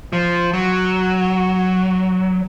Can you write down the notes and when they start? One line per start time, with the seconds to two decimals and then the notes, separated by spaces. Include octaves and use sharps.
0.13 F3
0.53 F#3